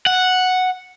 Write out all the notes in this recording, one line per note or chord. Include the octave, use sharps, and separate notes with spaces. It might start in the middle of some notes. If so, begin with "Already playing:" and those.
F#5